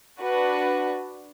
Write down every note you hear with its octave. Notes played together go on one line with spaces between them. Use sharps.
D4 F#4 B4